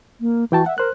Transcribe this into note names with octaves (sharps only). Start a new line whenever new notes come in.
A#3
E3 F#4 G5 A5
E5 F#5
A#4 C5 F#6